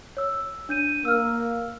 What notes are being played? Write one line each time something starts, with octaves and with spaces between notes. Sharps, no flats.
C#5 E6
D4 G6 D#7
A#3 E6 F6